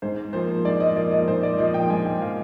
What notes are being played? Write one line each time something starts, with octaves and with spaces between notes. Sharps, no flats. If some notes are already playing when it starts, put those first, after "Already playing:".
G#2 C5
F3 A#3 C5
G#2 D5
D#5
F3 A#3 D5
D#5
G#2 C5
D5
F3 A#3 D#5
G5
G#2 G#5
G5
F3 A#3 F5